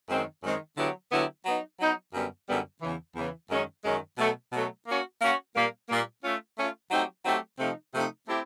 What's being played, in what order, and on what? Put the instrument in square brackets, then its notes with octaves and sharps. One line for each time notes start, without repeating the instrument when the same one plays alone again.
[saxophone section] F#2 D#3 G#3 C4
F#2 D#3 G#3 C4
D3 F#3 B3 E4 G4
D3 F#3 B3 E4 G4
F#3 B3 D#4
F#3 B3 D#4
F#2 D3 G3 B3
F#2 D3 G3 B3
E2 C#3 E3
E2 C#3 E3
F#2 D#3 G#3 C#4
F#2 D#3 G#3 C#4
B2 F#3 A3
B2 F#3 A3
A#3 C#4 F#4
A#3 C#4 F#4
A#2 G3 A#3
A#2 G3 A#3
A3 C#4 F4
A3 C#4 F4
F#3 A3 C4 D#4 G4
F#3 A3 C4 D#4 G4
C3 F3 A3 C4 D#4
C3 F3 A3 C4 D#4
A3 C4 E4 G4